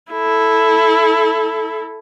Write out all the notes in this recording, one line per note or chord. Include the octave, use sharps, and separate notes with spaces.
E4 A4